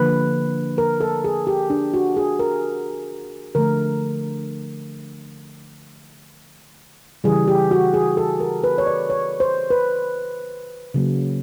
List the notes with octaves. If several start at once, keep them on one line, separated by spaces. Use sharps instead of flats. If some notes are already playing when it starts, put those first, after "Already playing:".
Already playing: D3 F3 A#3 B4
A#4
A4
G#4
G4
D4
F#4
G#4
A#4
D3 F3 A3 A#4
C#3 E3 G3 G#4
G4
F#4
G#4
A4
A#4
B4
C#5
D5
C#5
C5
B4
C#3 F#3 A#3